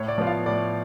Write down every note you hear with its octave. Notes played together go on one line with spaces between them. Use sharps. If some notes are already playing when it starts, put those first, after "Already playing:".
Already playing: A2 C#5
D5
F3 B3 F4
F5
A2 D5